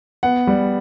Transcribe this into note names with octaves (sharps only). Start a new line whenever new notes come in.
B3 F#5
G3